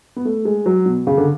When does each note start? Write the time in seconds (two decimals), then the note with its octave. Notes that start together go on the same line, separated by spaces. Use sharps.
0.16 B3
0.25 A3
0.45 G#3
0.66 F#3
0.86 B2
1.07 C#3
1.17 D3